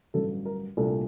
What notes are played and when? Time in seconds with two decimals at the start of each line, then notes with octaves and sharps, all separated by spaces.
0.14 A1 G2 D3 F#3 A4
0.45 A#4
0.77 C2 A#2 A3 D4 A4